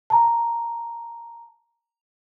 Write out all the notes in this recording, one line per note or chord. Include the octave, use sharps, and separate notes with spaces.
A5 A#5